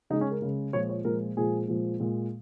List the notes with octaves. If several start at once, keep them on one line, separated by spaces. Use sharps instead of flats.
C#3 G#3 D#4
C#4
A#4
C#3 G#3
A#2 F3 G#3 C#5
C#5
A#2 F3 G#3 A#4
A#2 F3 G#3 G#4
A#2 F3 G#3
A#2 G#3